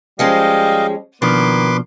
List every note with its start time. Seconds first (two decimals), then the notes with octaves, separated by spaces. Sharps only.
0.19 F3 G3 G#3 C#4 D#5 F5
1.22 B2 D#3 F3 A#3 D4 B4 C6 D6